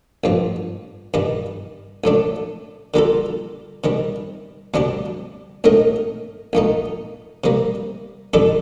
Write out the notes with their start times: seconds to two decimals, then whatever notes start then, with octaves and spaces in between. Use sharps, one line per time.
0.24 A1 G2 F3
1.14 G2 D#3 G3
2.04 A1 A2 A3 D4
2.94 D3 G3 A#3 F4 A4
3.84 C3 D#3 G3
4.74 D2 C3 G3 D4 G4
5.64 A#1 A2 A3 D#4 A#4
6.53 A#1 A#2 A3 D#4
7.44 C3 G3 A#3
8.34 F2 D#3 G3 D4 A4